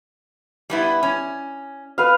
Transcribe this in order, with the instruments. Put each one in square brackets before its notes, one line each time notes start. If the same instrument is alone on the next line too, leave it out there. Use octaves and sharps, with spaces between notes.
[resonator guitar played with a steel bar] G3 B3 E4
C#4
[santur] B4 F5